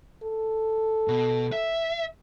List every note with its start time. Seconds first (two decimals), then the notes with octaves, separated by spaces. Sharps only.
0.23 A4
1.08 B2
1.52 E5